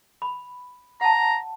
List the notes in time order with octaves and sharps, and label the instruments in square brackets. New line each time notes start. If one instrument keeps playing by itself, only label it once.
[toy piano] B5
[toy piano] F#5 A5 [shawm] A#5